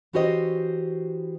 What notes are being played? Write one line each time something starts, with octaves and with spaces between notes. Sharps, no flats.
E3 C#4 F#4 G4 C5 D#5